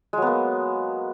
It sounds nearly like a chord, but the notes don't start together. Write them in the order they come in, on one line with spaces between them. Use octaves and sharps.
G#3 F#3 B3 A#3